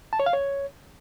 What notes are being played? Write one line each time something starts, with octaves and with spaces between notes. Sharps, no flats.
A5
C#5
F5
C#5